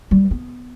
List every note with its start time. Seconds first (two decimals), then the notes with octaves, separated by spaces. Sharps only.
0.11 G3
0.31 B3